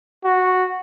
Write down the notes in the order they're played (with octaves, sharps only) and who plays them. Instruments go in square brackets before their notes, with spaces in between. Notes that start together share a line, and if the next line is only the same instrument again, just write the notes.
[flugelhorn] F#4